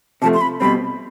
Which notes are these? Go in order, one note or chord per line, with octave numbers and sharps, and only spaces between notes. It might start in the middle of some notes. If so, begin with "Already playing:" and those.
C3 F3 A3 A5
C6
B5
B2 G3 C4 B5